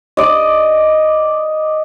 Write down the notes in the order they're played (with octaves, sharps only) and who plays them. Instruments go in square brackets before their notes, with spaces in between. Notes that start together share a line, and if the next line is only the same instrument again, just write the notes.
[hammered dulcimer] D5 D#5